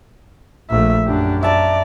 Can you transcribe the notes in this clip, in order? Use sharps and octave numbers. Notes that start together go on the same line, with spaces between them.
A#1 A3 E5
F#2 D4 G4
D5 E5 A5 A#5